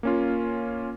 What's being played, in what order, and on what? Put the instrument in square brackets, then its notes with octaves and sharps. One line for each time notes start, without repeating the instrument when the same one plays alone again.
[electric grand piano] A#3 C#4 F4